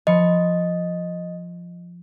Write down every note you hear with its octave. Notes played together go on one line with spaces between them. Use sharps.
F3 D#5 B5 C#7